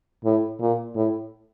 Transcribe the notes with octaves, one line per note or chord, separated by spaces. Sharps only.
A2
A#2
A2